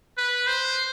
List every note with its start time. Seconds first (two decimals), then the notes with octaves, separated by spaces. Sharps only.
0.17 B4
0.47 C5